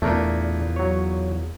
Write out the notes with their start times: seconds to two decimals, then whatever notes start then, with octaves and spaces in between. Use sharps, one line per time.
0.02 E2 A#2 A3 D4 A#4
0.76 F#3 C#5